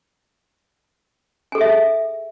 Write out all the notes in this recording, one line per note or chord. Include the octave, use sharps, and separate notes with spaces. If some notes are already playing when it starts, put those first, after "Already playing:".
G#4 A4 E5 G#5